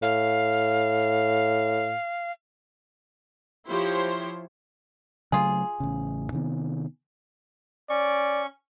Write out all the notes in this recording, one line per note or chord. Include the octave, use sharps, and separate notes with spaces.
A2 F5
F3 E4 G4 C5 C#5 C6
C#3 F#3 A3 F4 G#4
A1 C#3
C3 D#3 B3
C#4 D5 C#6